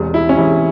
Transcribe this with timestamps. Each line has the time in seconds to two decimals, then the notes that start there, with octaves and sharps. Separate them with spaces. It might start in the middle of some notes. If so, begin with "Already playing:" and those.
Already playing: E1 E2 C3
0.14 E4
0.29 C#4
0.37 E1 E2 C3 E4